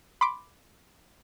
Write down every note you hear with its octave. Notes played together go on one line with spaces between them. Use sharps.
B5 C6 D6